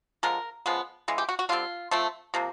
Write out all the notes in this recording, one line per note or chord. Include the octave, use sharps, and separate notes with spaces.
D3 F3 G#3 A#4
C#3 F3 G#3 B3
C#3 E3 G#3
G4
F#4
F#4
D3 G3 C4 F4
F3 A3 C4
C3 F3 A#3